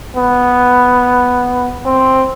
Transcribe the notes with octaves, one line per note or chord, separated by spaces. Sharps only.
B3
C4